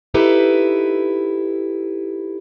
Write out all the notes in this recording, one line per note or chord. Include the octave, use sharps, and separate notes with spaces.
D#4 E4 G4 A4 B4